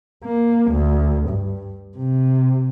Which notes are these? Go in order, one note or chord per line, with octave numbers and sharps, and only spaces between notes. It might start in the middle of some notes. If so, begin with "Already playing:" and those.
A#3
D2
G2
C3